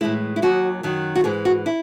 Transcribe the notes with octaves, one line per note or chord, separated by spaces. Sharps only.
A2 E3 G#3 E4
E4
D#2 D#3 F#3 F#4
F#2 D#3 F#3
F#4
G#2 E3 G#3 G#4
F#4
E4